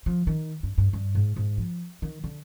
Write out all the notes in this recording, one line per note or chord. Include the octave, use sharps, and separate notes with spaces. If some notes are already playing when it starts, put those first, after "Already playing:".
F3
D#3
G2
G2
G2
G#2
G#2
F3
D#3
D3